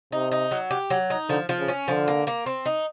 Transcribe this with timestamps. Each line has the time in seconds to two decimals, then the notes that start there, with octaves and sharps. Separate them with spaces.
0.12 C3 D#4
0.31 D#4
0.51 F#3
0.71 G4
0.90 F#3
1.10 D#4
1.29 D3 F3
1.49 F3
1.58 C#3
1.68 C#4
1.88 D3 F3
2.08 A#3
2.27 A#3
2.46 C4
2.66 D#4